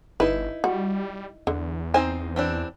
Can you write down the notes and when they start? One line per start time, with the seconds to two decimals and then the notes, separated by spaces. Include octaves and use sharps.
0.20 G1 D#4 E4 B4
0.64 G3 F#4
1.47 E2 D3
1.94 C4 D#4 C5 G#5
2.36 E3 C4 D4